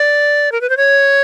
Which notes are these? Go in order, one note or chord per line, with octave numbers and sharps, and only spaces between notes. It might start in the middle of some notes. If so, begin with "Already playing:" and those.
Already playing: D5
A#4
B4
C5
C#5